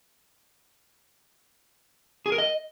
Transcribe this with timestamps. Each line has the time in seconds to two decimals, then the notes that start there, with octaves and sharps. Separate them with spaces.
2.26 G#4
2.32 A#4
2.38 D#5